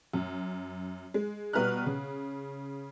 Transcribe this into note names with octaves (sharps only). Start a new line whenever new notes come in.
F#2
G#3
B2 G3 B4 A#5 F6 F#6
C#3